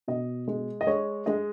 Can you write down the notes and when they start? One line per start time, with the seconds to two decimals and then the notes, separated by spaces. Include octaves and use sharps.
0.08 B2 D#5
0.48 G#3
0.81 D#5
0.87 G#3 C#5
1.26 G#3 D#5